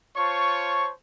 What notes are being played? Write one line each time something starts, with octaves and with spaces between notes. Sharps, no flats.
F4 C5 C#5 A5 C#6